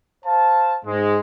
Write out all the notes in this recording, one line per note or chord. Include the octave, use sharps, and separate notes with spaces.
C5 F5 A5
G#2 G#3